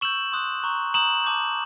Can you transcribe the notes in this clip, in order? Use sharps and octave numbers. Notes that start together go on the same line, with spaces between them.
C#6 E6 G6 E7 F#7
C6 D#6 F#6
A#5 C#6 F#6
A#5 D#6 G6 E7 F#7
A5 D6 G6